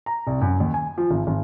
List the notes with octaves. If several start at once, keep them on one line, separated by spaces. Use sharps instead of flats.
A#5
C2
F#2
D#2
G#5
F3
G#1
G#1